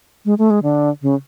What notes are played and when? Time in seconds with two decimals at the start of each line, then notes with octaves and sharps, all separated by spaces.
0.25 G#3
0.38 A3
0.50 G#3
0.63 D3
1.02 C#3